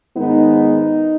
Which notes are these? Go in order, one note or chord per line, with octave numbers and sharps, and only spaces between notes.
G#2 D#3 G#3 B3 D#4